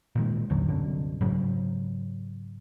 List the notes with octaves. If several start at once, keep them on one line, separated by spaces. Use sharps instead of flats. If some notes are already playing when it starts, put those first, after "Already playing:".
A#2 D#3 G#3
A1 D#2 D3 F#3
C2 F#2 B2 D3
G#2 C#3 F#3